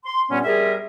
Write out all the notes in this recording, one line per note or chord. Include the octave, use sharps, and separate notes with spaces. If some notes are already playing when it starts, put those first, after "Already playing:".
C6
G2 A#2 G3 B3 C#4
G3 G#4 A#4 E5